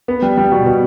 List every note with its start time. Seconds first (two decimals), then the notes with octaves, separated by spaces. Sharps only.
0.08 B3
0.22 G3
0.37 G3
0.52 B2
0.66 B2